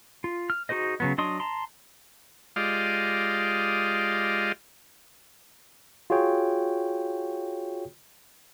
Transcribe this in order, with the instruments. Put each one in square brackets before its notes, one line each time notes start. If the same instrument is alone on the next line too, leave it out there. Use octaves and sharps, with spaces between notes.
[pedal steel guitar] F4
F6
D#4 F#4 G#4 C5 D#5
C#3 F#3 B3
F#3 D4 D#5 C6 D#6
A5 A#5 C6
[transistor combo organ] G#3 F4 G4 D5 D#5 F5
[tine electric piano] F4 F#4 G#4 C#5 G5